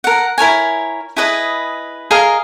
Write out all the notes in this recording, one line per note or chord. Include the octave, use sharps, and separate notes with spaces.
A#4 F#5
E4 A#4 C#5 G#5
E4 G#4 B4 D#5
G#4 A#4 D#5 F5